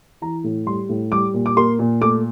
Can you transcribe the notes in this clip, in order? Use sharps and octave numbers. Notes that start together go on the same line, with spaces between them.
E3 A#5
A2
G3 C6
A2
G3 D6
A#2
D6
A#3 C6
A#2
A3 D6